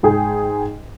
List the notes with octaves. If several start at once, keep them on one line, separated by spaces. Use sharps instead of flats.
G#2 G#4 G5